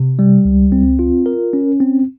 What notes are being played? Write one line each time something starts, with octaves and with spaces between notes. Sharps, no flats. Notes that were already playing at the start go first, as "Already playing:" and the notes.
Already playing: C3
G3
C#2
C4
F4
A#4
C#4
C4